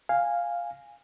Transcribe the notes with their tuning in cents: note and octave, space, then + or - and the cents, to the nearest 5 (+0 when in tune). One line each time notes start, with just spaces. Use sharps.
F5 +0 G#5 -15